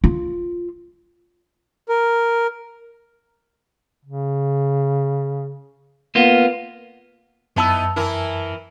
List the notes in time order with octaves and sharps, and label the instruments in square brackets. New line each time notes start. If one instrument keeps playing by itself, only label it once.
[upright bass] F4
[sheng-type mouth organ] A#4
[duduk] C#3
[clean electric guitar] A#3 B3 F4
[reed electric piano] F#2 A5 E6 [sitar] B3 D#4 E4
[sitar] E3 E4 A#4